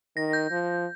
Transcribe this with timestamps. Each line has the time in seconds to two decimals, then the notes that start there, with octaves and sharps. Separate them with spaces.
0.16 D#3 A#6
0.33 G6
0.51 F3